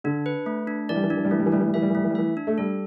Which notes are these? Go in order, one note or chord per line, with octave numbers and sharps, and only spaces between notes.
D3 D4
B4
A3
D4
E3 D5
G3
E3
G3 D4
E3
G3
E3 A3
G3
E3
G3 A3
E3
G3
E3 E5
G3
E3
G3 A3
E3
G3
E3 E5
D4
A3
G3 A4